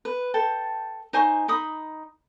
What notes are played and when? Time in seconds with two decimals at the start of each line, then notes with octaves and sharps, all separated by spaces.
0.05 B4
0.34 A4 G5 A5
1.13 D#4 C5 G#5 C#6
1.48 D#4 B5 D#6